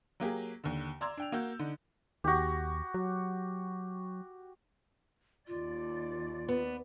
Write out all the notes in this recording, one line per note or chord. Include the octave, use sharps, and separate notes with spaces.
F#3 A#3 G4 G#4
D#2 D3
D5 A#5 C6 E6 G#6
D4 G5 F7
A#3 F#4 E6 G6
D3 D#4
D#2 F#4 G4
F#3
D#2 F4 D5
B3